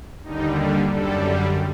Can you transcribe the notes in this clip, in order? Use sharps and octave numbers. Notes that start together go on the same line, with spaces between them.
D#2 D3 G3 D#4
F#2 D3 G3 A4